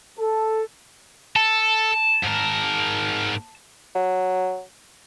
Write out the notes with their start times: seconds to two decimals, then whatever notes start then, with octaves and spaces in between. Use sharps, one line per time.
0.18 A4
1.36 A4 A5
2.23 G#2 A#4
3.95 F#3